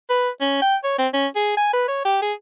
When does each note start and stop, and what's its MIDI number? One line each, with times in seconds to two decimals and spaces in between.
0.10 0.29 71
0.41 0.58 61
0.62 0.76 79
0.84 0.94 73
0.99 1.08 60
1.14 1.27 61
1.36 1.57 68
1.57 1.71 80
1.73 1.83 71
1.88 2.00 73
2.05 2.19 67
2.22 2.33 68